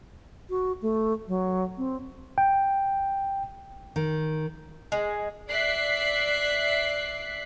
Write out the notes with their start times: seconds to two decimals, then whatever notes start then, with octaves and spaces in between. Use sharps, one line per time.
0.50 F#4
0.82 A3
1.28 F#3
1.78 C4
2.38 G5
3.96 D#3
4.92 G#3
5.50 D5 E5 F#6 B6 C7